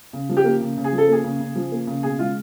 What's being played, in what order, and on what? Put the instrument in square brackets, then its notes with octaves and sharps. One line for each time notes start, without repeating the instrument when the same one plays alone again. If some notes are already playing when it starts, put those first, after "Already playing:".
[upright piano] C#3
F3
G4
A#3
C#3
C#3
G#4
F3
A4
A#3 G#4
C#3
C#3
F3
A#3
C#3
B2 G#4
G#3 F4